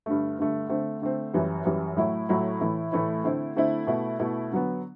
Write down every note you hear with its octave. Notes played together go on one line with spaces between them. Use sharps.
G2 D3 A3
G2 D3 A3
D3 A3 C4
D3 A3 C4
F#2 E3 G3
F#2 E3 G3
A2 F#3 A3 E4
A2 F#3 A3 E4
A2 E3 A3 E4
A2 E3 A3 E4
D3 A3 C4 E4
D3 A3 C4 E4
B2 A3 E4
B2 A3 E4
D3 F#3 B3